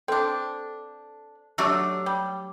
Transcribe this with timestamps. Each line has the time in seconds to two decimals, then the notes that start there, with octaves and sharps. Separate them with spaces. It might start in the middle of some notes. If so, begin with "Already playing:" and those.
0.08 C4 D4 A4
1.58 F#3 A3 D4 G4 E6
2.06 G3